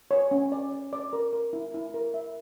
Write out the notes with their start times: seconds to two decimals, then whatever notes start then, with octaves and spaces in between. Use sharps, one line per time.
0.11 C#5
0.31 C#4
0.52 D5
0.72 D5
0.93 D5
1.13 A#4
1.33 A#4
1.53 E4
1.74 E4
1.94 A#4
2.14 E5